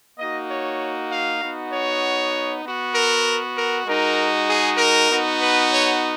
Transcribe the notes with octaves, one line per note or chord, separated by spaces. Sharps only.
A#3 D#4 F#4 D#5
C#5
F5
B3 D#4 F#4
C#5
B3 F#4
A#4
A#4
G#3 D#4 F#4 A#4
G#4
A#4
B3 D#4 F#4
B4
C#5